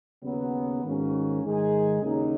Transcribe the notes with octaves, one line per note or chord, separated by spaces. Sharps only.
D#2 C#3 F#3 B3
G#2 D#3 A#3 C#4 F#4
G#2 D#3 G#3 D#4 G#4
D#2 C#3 F#3 A#3 D#4